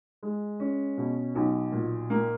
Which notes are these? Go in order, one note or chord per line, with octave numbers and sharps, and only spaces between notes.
G#3
C#4
B2
B1
A#2
A#3